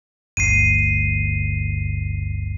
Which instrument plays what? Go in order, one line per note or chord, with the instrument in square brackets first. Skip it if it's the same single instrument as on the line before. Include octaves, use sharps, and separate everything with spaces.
[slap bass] G1 D2 [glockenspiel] C7 D#7